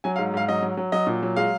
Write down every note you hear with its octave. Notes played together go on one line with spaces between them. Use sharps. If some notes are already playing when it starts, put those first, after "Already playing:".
F#3 G#5
F5
G#2
G#2 F5
F#3 D#5
F#3
F#3
F#3 D#5
A#2
F#3
G#3 F5